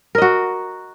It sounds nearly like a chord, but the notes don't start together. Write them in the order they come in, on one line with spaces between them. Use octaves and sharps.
A#4 D#5 F#4